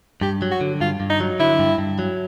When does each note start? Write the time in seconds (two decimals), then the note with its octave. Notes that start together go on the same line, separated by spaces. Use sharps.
0.21 G2 G4
0.42 F#3
0.51 F#4
0.61 D3
0.80 G2 F4
1.00 G2
1.10 D#4
1.20 F#3
1.39 D3 E4
1.59 G2
1.78 G2
1.99 F#3